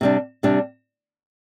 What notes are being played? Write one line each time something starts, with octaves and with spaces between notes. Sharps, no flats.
C3 G3 D4
C3 G3 D4